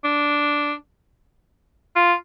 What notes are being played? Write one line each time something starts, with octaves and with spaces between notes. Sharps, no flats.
D4
F4